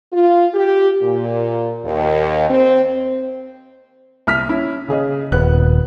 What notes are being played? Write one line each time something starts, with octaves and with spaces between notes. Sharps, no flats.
F4
G4
A#2
D#2
C4
C2 F6 B6
C#4 E4
C#3 G#4 D#5
D#1 B3 F#6